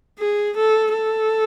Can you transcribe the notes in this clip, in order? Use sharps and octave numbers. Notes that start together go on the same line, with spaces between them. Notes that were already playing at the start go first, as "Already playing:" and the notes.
G#4
A4
A4